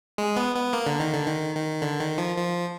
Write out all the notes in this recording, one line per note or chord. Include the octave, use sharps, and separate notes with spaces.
G#3
B3
B3
A#3
D3
D#3
D3
D#3
D#3
D3
D#3
F3
F3